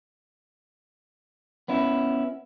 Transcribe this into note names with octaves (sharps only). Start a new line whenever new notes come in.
B3 C#4 E4